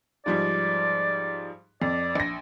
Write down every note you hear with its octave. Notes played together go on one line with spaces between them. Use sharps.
G#2 F3 G3 D5
F2 D5
A#1 A#6